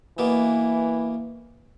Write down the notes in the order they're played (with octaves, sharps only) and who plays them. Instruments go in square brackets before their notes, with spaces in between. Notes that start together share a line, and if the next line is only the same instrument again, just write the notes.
[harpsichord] B2 A#3 B3 [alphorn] E3